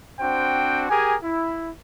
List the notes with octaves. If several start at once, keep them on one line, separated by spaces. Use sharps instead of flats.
C4 D4 F#4 C5 G5
G4 G#4 A#4 G#5
E4